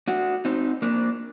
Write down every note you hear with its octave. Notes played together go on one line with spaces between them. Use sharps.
D4 F#4
C4 D#4
A#3 D4